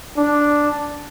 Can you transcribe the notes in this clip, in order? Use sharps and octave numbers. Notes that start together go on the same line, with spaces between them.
D4